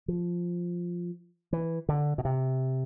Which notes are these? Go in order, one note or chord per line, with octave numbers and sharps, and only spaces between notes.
F3
E3
D3
B2
C3